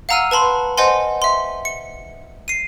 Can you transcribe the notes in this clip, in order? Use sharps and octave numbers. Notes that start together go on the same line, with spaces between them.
F5 F#5 A#5 E6 F6 D#7
B4 A5 B5 C6
C5 D#5 F#5 G#5 C6
E5 C6
C#7
C7 D#7